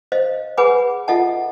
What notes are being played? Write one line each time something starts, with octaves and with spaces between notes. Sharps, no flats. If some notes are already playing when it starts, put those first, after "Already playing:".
C5 D#5 F5
G#4 B4 F#5 G#5 B5 D6
F4 A4 D#5 E5 F#5 A5